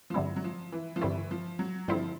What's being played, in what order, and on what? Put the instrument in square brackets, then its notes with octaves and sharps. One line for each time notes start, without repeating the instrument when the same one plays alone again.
[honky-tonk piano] F3
[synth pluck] G2 D3 G3 C4 E4 [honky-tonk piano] F#3
[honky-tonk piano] F#3
F3
E3
F3
[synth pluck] G2 D3 G3 C4 E4 [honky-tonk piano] E3
[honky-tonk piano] F3
F#3
[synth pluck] G2 D3 G3 C4 E4 [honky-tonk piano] F3